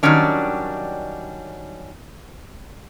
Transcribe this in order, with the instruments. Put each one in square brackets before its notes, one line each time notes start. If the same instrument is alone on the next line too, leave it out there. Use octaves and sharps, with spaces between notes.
[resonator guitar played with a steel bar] D#3 E3 F#3 G3 C#4 D4